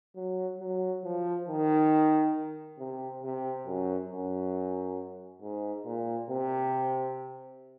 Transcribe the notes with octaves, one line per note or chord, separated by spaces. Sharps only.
F#3
F#3
F3
D#3
C3
C3
F#2
F#2
G#2
A#2
C3